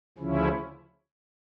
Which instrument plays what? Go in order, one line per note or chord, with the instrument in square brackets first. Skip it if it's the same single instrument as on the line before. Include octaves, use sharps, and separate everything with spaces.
[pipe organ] D2 C#3 F3 C#4 E4